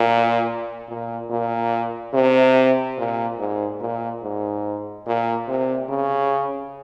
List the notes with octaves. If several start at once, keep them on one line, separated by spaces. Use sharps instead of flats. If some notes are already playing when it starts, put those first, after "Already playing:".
Already playing: A#2
A#2
A#2
C3
A#2
G#2
A#2
G#2
A#2
C3
C#3